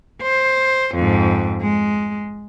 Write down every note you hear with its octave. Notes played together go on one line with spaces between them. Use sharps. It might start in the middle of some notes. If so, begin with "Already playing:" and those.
C5
F2 G#2
G#3